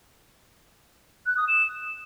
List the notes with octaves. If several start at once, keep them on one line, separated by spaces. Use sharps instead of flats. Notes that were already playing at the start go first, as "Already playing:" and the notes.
F#6
D#6
E7